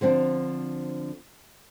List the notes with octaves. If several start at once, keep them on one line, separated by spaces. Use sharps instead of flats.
D3 F3 C4 D4